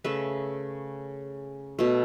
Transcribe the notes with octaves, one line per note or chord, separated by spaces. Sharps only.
C#3 A3 B4 E5
B2 A3